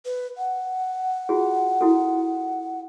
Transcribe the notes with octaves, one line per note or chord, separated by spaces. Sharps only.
B4
F#5
F4 F#4 G#4
E4 F#4 A4